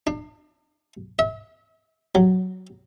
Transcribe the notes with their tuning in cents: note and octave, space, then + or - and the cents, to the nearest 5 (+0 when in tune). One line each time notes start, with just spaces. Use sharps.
D4 +40
E5 -40
F#3 +5